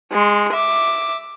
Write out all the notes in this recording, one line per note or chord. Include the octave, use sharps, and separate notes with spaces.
G#3 C6
E5 D6